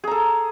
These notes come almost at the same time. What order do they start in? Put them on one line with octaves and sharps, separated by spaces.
G#4 A#5 A4